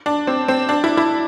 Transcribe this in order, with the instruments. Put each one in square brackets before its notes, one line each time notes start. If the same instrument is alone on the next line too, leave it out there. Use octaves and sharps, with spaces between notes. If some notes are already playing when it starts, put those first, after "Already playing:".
[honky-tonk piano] D4
C4
C4
D4
E4
E4